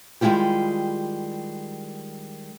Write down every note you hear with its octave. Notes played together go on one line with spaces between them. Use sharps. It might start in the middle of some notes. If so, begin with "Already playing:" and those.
D#3 G3 G#3 E4 F4 G4